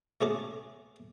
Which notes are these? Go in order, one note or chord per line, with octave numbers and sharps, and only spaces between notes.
B2 A3 C#4 G#4 A#5 D6